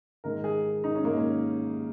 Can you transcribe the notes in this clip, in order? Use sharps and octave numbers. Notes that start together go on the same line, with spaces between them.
G#2 D#3 A#4
G#4
D#4
C#4
G#2 D#3 A#3
C#4